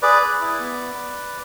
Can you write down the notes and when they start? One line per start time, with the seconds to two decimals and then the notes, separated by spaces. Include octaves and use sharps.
0.02 G#4 B4 D5
0.22 G#4
0.41 E4
0.59 B3